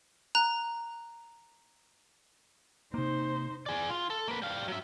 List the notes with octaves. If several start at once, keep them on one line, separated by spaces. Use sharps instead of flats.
A#5 F#6
C3 A#3 D#4 C5
G#4 D5
F4
A4
A#3 B4
G3 F5
F#3 E5